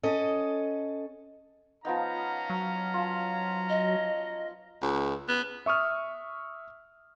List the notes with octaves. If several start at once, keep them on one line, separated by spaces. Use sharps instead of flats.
C#4 A4 D#5
F3 B3 C#4 D#4 F5 A#5
F#3
F4 A5
D#5
C#2
B3
E5 C#6 D#6 F6